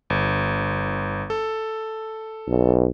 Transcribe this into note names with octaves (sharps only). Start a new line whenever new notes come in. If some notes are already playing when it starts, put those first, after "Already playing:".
G1
A4
B1